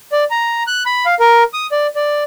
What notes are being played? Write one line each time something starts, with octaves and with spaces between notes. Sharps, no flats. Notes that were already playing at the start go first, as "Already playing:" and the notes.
D5
A#5
F#6
B5
F5
A#4
D#6
D5
D5